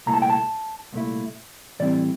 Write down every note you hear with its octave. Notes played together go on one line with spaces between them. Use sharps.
C2 A#2 A3 E4 A#5
A5
G5
A5
C2 A#2 A3 E4
A2 E3 G3 C4 E4 D5